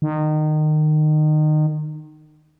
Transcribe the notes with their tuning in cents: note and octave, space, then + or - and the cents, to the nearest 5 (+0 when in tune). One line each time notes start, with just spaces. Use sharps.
D#3 -25